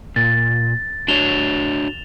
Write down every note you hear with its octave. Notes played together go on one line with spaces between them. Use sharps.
A#2 A6
D4 F#4 C#5 E7 F7 G7